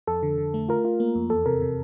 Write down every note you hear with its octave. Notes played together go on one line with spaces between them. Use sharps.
F2 A4
D3
D3
A3
F4 A#4
F4
A#3
F2
E2 A4
C3 A#4
C3